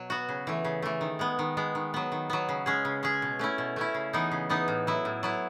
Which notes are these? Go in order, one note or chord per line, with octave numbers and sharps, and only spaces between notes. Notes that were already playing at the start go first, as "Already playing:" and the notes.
Already playing: B2 F#3
B3 F#4
C#3
E3 A3
C#3
E3 A3
D#3
G#3 B3
D#3
G#3 B3
D#3
F#3 B3
D#3
F#3 B3
C#3
G#3 C#4 G#4
C#3
G#3 C#4 G#4
B2
A3 C#4 E4
B2
A3 C#4 E4
C#3
E3 B3 D#4
C#3
E3 B3 D#4
A2
F#3 B3 E4
A2
F#3 B3 E4